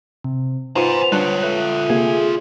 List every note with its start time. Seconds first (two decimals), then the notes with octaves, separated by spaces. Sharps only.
0.24 C3
0.76 B3 D#4 F4 C5 G#5 A#5 C#7
1.12 G3 D4 F4 C#5 F#6
1.43 A3 B4
1.90 C3 A#3 G#4